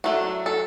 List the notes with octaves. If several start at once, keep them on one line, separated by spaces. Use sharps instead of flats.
F#3 A3 D4 F#4
A4